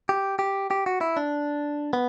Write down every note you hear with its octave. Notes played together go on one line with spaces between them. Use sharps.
G4
G4
G4
F#4
E4
D4
B3